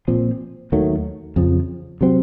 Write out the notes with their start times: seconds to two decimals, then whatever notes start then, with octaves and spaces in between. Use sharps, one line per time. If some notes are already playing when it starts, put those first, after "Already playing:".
0.08 A#2 F3 C4
0.72 D#2 D#3 F#3 A3
1.36 F2 C#3 F3
2.01 C3 F#3 C4